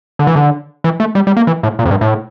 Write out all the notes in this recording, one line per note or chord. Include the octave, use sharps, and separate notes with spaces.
D3
E3
D3
E3
A3
G3
G3
A#3
E3
A2
A#2
F2
G2
A2